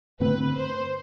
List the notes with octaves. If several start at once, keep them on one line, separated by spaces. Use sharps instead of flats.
G2 D3 A3 C4 B4
C5